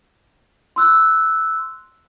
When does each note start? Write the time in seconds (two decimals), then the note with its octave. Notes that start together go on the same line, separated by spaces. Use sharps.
0.76 C6 E6 F#6